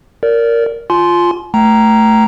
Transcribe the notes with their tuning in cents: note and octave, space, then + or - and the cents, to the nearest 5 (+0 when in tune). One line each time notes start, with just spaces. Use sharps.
A#4 -5 D5 -25
F4 +0 G#5 +40 C6 +0
A3 +0 G5 -30 A#5 +0